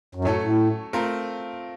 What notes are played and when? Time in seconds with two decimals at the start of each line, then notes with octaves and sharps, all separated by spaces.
0.15 F#2
0.25 A2 F#3 A3 C#4 A4 C#5
0.43 A2
0.93 A3 C4 F4 A#4